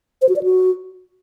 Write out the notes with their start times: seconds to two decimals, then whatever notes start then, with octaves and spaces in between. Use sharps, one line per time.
0.22 C5
0.29 F#4
0.36 D5
0.43 F#4